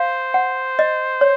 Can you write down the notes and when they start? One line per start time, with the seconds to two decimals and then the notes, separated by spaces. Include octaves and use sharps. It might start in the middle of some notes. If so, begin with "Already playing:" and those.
Already playing: C5 F5
0.34 F#5
0.79 D#5
1.21 C#5